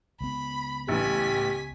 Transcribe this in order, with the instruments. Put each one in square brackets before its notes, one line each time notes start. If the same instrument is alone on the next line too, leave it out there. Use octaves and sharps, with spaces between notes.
[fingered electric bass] C#2 B3 [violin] B5
[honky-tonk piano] A1 E3 [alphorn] G4 [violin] G#5 B6